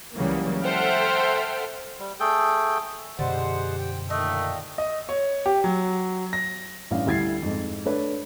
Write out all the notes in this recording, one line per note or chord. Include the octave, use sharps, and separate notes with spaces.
C#2 C#3 E3 F#3 G3 A#3
A4 C5 E5 F#5 G5 F6
G3
A3 G#4 A4 G5
F#2 B2 D3 G3 G#3 C5 F#5
G5
A#2 D#3 A3 D#5
D#5
C#5
G4
F#3
A#6
A1 G2 F5
D2 G3 E4 G#6 A6 C7
F2 G#2
A3 D4 B4 C#5